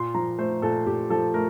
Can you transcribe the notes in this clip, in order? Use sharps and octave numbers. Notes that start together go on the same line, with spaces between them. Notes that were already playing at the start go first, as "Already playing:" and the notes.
Already playing: A#2 C6
F3 A#5
A3 C5
A#2 A4
A#2 G4
F3 A4
A3 A#4